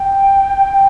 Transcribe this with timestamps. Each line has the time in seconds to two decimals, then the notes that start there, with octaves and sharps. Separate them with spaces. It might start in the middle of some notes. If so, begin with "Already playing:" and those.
Already playing: G5
0.73 G5